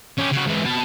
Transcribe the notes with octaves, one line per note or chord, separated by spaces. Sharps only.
C#4 G4
C#3 F#4
G#2 E3
B2 A5